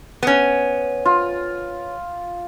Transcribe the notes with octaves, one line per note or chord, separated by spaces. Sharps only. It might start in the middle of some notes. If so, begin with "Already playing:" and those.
B3 C#4
F4